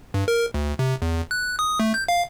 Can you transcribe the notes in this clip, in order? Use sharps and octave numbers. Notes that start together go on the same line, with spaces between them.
G2
A#4
D2
C3
E2
F#6
D#6
A3
G6
F5